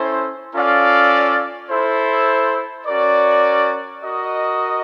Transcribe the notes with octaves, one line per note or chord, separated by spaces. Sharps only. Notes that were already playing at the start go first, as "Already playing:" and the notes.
Already playing: C#4 E4 A4 C5
C#4 F4 A4 D5 F5
E4 A4 C5
C#4 F#4 A#4 D5
F#4 A#4 D#5